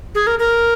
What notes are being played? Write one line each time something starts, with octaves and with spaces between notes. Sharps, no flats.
G#4
A#4
A#4